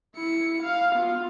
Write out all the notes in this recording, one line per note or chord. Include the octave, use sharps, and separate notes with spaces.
E4 C#7
F5
B3 F4